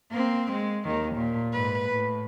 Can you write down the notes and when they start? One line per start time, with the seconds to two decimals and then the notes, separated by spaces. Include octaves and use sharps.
0.11 A#3 C4
0.52 G#3
0.85 D#2 D#3
1.15 A#2
1.53 G#2 B4
1.91 A2